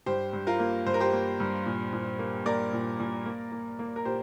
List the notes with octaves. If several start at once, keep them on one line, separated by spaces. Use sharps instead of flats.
G2 G4 C5
G2
F4 A#4
A#3
G2 C5
A#4
G4 C5
A#3
G2
A#2
A#2
A#3
A#3 A#4 D5
A#2
A#2
A#3
A#3
A#3
A#4
A#2 G4 C5